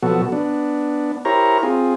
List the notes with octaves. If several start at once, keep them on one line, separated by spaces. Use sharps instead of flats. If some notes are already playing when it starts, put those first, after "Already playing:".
B2 F3 F#3 B3 F#4 A4
B3 D4
E4 G4 A#4 C5 C#5 A#5
C4 F4 G#4